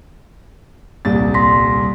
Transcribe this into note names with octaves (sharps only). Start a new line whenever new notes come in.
D#1 C2 A6
C6 A#6 B6